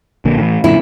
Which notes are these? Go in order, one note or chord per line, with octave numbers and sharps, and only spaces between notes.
A#1 D3 A#3
A2 D3 E3
F#2 A#2 D3 E4